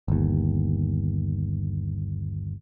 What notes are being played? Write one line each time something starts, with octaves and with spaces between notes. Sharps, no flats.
G1 D#2